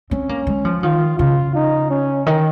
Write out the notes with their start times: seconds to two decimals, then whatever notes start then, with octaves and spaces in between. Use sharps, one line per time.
0.11 C4 C#4
0.29 A#3
0.47 G#3
0.65 F3
0.83 D#3 F4
1.19 C#3 F4
1.55 D#4
1.90 C#4
2.26 D#3